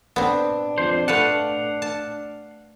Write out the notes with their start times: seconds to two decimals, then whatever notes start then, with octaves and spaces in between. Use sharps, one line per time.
0.16 B3 C4 D4
0.78 F2 C5
1.08 A3 B4 F5 F#5 A5
1.82 A5